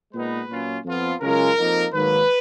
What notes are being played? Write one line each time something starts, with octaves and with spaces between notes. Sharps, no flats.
A#2 G#3 B3 D#4 B4
A#2 F#3 C#4 F4
F2 F3 B3 F4
F#2 C#3 G#3 C#4 F4 A#4
F2 F3 A#3 D#4
G#2 D#3 F#3 A#3 B4